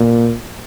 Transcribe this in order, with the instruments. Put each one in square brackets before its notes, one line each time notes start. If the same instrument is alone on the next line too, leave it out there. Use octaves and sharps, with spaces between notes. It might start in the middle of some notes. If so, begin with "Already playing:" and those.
Already playing: [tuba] A#2